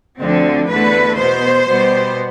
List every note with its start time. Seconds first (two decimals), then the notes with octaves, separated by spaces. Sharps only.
0.19 D2 D3 F3 C4
0.68 E2 D3 A3 B4
1.17 B2 B3 C5
1.67 B2 G3 B3